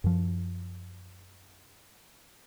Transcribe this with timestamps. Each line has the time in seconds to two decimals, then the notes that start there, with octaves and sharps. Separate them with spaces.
0.04 F#2 F3